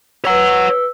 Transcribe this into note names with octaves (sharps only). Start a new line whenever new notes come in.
B4 C#5 F#5 E6